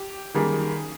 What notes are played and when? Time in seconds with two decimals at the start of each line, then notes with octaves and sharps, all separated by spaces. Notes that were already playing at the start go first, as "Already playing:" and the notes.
Already playing: G4
0.34 F#2 D#3 G3 A#3 G#4